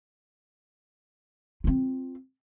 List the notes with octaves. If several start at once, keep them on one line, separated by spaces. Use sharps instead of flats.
C4 F4